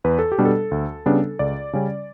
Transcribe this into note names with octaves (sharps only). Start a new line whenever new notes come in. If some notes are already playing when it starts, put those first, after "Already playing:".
E2 B4
A4
G4
B2 G3 D4
A4
D2
C#3 G3 B3 D4
C#2 D5
C#3 G3 C#4